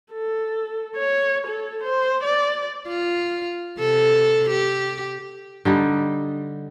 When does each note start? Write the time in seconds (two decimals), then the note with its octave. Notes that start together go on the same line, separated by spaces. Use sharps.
0.13 A4
0.96 C#5
1.47 A4
1.84 C5
2.23 D5
2.88 F4
3.79 C3 A4
4.50 G4
5.65 D3 G3 D#4